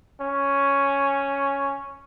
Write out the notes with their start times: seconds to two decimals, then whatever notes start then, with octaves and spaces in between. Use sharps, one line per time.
0.21 C#4